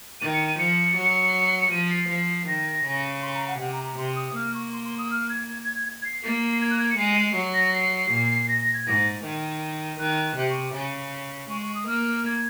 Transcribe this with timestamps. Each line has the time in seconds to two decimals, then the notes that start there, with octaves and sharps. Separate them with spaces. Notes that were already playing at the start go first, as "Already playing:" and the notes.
0.21 D#3 D#7
0.33 C#7
0.47 D#7
0.58 F3 C#7
0.97 F#3
1.71 F3 D#7
1.90 C7
2.09 F3
2.47 D#3 A#6
2.85 C#3
3.22 C6
3.34 A#5
3.47 F#5
3.59 C3 F#5
3.73 A#5
3.84 A#5
3.98 C3 C6
4.16 D#6
4.35 A#3 F6
4.54 C#6
4.73 C6
4.85 C6
4.98 D#6
5.11 F6
5.30 G#6
5.86 G#6
6.05 C7
6.23 A#3
6.61 G#6
6.70 F#6
6.79 G#6
6.90 C#7
6.98 G#3 C7
7.35 F#3
7.54 A#6
7.74 C7
8.11 A#2
8.49 A#6
8.61 A#6
8.74 G#6
8.86 G#2 A#6
9.24 D#3
9.99 D#3 F#6
10.18 F#6
10.37 C3
10.50 C#6
10.74 C#3
11.50 G#3 C#6
11.62 C#6
11.75 D#6
11.87 A#3 F6
12.25 G#6